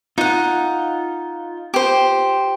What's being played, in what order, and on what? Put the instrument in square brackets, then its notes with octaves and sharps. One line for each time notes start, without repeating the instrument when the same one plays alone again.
[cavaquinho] D#4 F#5 [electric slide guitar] F4
[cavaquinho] G4 C5